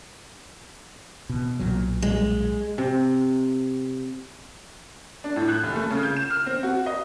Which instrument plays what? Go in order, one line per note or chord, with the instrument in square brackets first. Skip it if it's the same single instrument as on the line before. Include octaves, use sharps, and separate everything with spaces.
[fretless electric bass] B2
B1 A#2 F#3
[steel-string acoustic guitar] G#3
[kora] C3
[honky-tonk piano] D4
A2
F#6
F1
A3
C#3
G6
E7
F6
C4
F#4
D#5